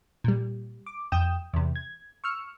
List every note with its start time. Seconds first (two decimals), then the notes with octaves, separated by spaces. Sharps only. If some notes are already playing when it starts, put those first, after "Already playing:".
0.24 A#2 G3
0.86 D6
1.12 F2 G5 D#6 G6 E7
1.53 E2 C3
1.76 G#6
2.24 C#6 E6 F6 C#7